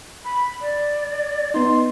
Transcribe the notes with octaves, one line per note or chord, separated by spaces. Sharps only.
B5
D5
B3 D#4 C6